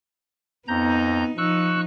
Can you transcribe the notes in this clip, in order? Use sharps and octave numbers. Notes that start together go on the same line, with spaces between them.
F2 B3 D#4 A#5 G6
F3 D#4 C#6 E6 F#6